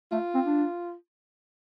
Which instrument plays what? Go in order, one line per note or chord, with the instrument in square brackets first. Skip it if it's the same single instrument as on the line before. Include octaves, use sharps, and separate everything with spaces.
[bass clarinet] A3 [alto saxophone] F4
[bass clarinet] C4
D4